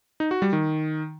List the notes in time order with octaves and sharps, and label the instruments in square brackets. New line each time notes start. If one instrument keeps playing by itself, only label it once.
[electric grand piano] D#4
F#4
G3
D#3